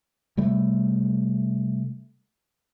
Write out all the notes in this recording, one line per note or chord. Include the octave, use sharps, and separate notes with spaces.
C3 G3 A3